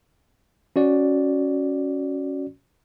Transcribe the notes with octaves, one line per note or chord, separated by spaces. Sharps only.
C#4 F#4 D5